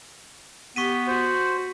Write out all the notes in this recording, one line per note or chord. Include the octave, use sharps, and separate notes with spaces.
B3 G4 C#6 B6 D#7
F#4 C5